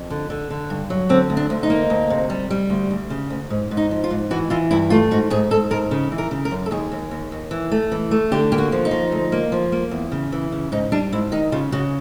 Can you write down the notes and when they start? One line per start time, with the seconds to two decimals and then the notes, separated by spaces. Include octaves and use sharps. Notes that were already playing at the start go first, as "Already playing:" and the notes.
Already playing: F2
0.10 D3
0.30 D3
0.50 D3
0.70 G2
0.90 F#3
1.09 D3 C4
1.30 D2
1.37 D4
1.50 D2
1.63 D#4
1.70 A#3
1.90 D2
2.10 C3
2.30 G3
2.51 G3
2.70 D2
2.91 D2
3.10 C#3
3.30 D2
3.50 G#2
3.71 G#2
3.77 D#4
3.91 F3
4.04 F4
4.10 G#2
4.31 E3 F#4
4.50 E3 F4
4.71 G2 E4
4.90 A3 F4
5.11 G#2 F#4
5.30 G#2 G#4
5.51 G#2 A4
5.71 G#2 A#4
5.91 C#3
6.12 E3
6.18 A#4
6.31 C#3
6.45 A#4
6.51 F#2
6.66 A4
6.71 D#2 G#4
6.91 D#2
7.11 D#2
7.32 D#2
7.51 E3
7.71 A3
7.92 E3
8.11 A3
8.32 D3 G4
8.52 A#3 G4
8.58 F#4
8.72 F3
8.85 D#4
8.91 F3
9.12 D2
9.32 A#3
9.52 F3
9.72 A#3
9.91 E2
10.12 C#3
10.32 E3
10.52 C#3
10.72 G#2 D#4
10.92 G3 D4
11.12 G#2 E4
11.32 D#3 D#4
11.52 C#3 F4
11.72 C#3 F#4